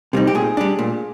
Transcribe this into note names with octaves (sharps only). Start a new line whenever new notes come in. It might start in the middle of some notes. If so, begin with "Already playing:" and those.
C3 G3 C4 D#4
G4
A#2 G#4
G3 D4
A#2